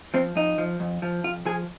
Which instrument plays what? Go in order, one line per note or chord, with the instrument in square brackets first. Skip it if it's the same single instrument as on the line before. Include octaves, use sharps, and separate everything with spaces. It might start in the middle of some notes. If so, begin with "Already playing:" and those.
[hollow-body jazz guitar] F3 C4
F2 D#4
F3
F2
F3
F2 F4
F3 G#4